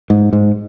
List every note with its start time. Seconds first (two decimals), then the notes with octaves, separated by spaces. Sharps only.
0.10 G#2
0.33 G#2